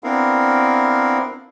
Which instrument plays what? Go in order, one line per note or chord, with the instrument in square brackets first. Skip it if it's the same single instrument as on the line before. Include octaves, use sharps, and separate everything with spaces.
[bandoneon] B3 C4 D4 E4 A#4 F5